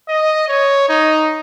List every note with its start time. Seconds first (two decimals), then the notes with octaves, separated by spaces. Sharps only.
0.08 D#5
0.48 C#5
0.89 D#4